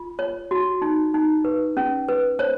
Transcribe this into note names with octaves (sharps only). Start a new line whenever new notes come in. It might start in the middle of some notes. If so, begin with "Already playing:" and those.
Already playing: F4
C#5
F#4
D#4
D#4
B4
C#4
B4
C5 C#5